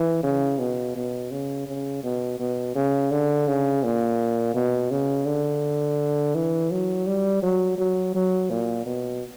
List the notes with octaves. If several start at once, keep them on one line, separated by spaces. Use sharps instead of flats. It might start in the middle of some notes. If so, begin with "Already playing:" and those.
Already playing: E3
C#3
B2
B2
C#3
C#3
B2
B2
C#3
D3
C#3
A#2
B2
C#3
D3
E3
F#3
G3
F#3
F#3
F#3
A#2
B2